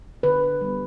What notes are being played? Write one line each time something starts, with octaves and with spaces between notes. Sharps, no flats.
D3 B4
G3 B3